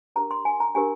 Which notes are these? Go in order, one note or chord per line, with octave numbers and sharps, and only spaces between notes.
D4 G4 A#4 A#5
C6
G#5
A#5
D4 G4 A#4 G#5